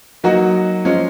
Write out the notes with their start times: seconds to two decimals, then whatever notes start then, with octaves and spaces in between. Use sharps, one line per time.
0.24 F#3 A#3 D#4 F#4
0.85 F3 G#3 C#4